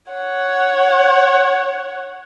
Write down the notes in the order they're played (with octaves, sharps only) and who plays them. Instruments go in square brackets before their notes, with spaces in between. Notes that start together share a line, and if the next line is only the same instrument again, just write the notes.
[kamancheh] C#5 F#5